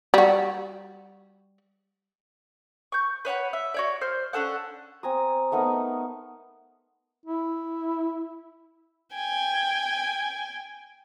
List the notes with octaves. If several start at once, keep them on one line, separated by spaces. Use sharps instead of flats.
G3 F#4
C#6 G6
B4 C#5 F#5 B5
E5
F#4 C#5 D5
C5 F6
C#4 D4 A4 F#5
C4 G#5 A#5 D#6
A3 B3 D#4 A#4
E4
G5 G#5